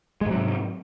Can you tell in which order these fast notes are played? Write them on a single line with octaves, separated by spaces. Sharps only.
G#3 G#2 F#3 C3